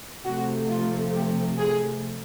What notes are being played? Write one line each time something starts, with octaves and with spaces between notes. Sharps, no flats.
C3 F3 A3 F#4
F4
G4
G#4